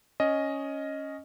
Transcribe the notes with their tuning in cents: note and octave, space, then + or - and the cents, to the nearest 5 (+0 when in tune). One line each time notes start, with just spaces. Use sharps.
C#4 +0 D#5 +0